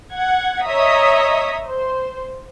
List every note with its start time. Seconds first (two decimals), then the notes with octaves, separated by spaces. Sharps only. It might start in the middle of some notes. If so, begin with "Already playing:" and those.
0.13 F#5 G#6
0.63 C#5 D#5 E5 A#5 D#6 B6
1.67 C5